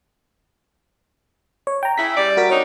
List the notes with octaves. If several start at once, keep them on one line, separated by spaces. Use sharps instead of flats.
C#5
G5 A#5
C#3 E4 B6
G3 D5
F#4 A#4 B6
C4 D4 D#4 C#5